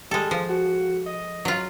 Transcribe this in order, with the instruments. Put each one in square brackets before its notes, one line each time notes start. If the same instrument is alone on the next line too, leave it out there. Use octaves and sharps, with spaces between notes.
[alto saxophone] G3 [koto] G#3 A4
[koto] F3
[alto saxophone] F#4
D#5
[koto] F#3 F4